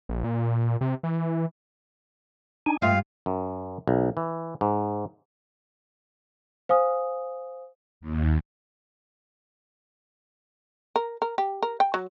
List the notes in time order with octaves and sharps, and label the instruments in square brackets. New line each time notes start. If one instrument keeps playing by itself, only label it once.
[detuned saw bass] A#1
A#2
C3
E3
[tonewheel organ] D4 D#4 G#5
[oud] G2 F4 [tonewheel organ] A3 [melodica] F5
[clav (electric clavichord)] F#2
B1
E3
G#2
[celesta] C5 F5 G#5 D#6
[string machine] D#2
[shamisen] A#4
A#4
G4
A#4
G5
F#3